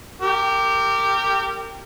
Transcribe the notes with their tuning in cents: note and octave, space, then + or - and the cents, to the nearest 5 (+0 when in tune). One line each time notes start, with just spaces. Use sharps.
G4 +0 A#4 -30